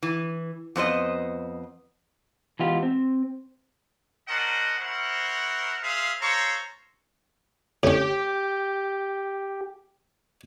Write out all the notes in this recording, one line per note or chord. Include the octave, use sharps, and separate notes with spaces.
E3
F2 B3 C5 D#5
E3 G#3 B3 F4 G4
C4
C#4 D4 A#4 C5 D#5 F#5
E4 A#4 C5 C#5 F#5
G#4 C5 E5 F5
A4 C5 C#5 F5 A#5 C#6
A2 C#4 G4